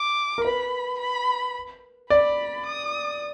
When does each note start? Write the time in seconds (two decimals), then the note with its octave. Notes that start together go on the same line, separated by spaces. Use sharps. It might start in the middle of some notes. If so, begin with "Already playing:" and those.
Already playing: D6
0.38 A#4
0.44 B4 B5
0.99 B5
2.10 D5 B5
2.66 D#6